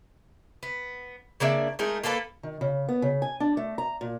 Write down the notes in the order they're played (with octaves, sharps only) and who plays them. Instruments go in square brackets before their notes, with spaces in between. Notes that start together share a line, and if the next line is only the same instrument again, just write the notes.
[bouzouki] B3
C#3 A#3 D4 E5
G#3 A3 D#4 A#4
A#3 F4 A4 B4
[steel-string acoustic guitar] D#3
C#3
B3
C#3
G#5
D4
A3
A#5
A#2